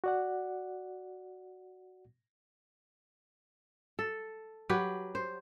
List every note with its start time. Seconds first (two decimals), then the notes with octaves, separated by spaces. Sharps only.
0.04 F#4 D5 F#5
3.99 A4
4.69 F#3 G4 B4
5.15 C5